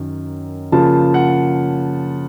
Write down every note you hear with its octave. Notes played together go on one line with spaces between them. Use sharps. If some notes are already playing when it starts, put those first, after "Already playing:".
Already playing: F#2 D#3
C#3 F3 A#3 F4 A5
F#5